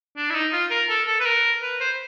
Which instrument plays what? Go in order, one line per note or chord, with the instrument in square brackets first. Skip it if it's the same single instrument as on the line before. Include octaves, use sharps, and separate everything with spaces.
[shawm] D4
E4
D#4
F4
A#4
A4
A4
B4
A#4
B4
C5